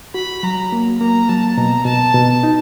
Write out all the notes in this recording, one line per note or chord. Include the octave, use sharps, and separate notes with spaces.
F#4 B5
F#3 A#5
A#3
A#3 A#5
F#3 A5
B2 A#5
B2 A5
B2
D#4